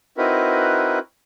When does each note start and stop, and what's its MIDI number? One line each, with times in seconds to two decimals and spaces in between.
0.18 0.99 60
0.18 0.99 63
0.18 0.99 64
0.18 0.99 66
0.18 0.99 70
0.18 0.99 71